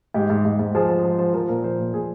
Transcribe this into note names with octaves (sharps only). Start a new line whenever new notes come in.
G#2 G4
G#2
G#2
G#2
F3 G#4
F3
F3
F3
F3 A#4
A#2 A#4
F3 C5
A#2
A#2 G#4